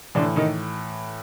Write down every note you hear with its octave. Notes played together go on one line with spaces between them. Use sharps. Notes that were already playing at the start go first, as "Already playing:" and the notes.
A2 D3 E3 D4
D#3 D#4